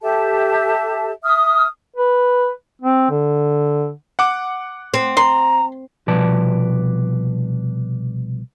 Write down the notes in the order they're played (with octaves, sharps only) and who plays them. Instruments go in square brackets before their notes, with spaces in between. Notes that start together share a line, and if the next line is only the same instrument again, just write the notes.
[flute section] G4 A4 E5 A5
E5 D#6 F6
[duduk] B4
C4
D3
[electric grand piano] F#5 D6
[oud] C4
[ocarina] A#5 [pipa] C6
[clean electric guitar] C2 B2 F3 B4 D5 A5